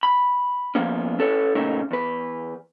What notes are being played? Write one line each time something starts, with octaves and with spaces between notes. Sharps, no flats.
B5
F3 G#3 A#3 B3 C#4
C#4 A4 B4 C#5
A#2 C#3 A3 C#4 D#4 A#4
E2 B4